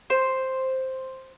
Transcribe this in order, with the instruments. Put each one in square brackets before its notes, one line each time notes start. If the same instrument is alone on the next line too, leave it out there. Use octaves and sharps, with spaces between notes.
[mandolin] C5